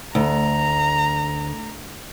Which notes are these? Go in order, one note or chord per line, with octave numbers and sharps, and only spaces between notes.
D2 A#5